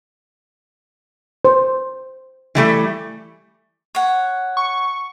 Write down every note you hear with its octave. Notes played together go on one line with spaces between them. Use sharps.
C5
E3 G3 A3
C#5 F#5
C#6